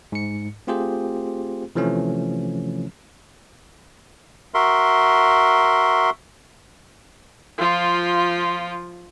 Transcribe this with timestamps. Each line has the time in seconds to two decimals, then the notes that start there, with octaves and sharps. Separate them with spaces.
0.12 G#2 C#7
0.67 A3 C4 F4 G4 G#4 C5
1.75 C3 E3 F3 A3 C#4
4.54 F#4 A#4 E5 C6
7.58 F3 F4